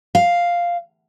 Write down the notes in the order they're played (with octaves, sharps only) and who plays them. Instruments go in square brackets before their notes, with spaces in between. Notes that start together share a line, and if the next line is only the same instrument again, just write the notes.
[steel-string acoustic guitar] F5